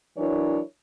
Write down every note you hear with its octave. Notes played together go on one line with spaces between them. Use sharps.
E3 F#3 D4 E4 A#4 C#5